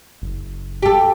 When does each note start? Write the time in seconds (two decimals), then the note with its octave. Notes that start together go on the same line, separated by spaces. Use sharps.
0.22 F#1
0.83 G4 A4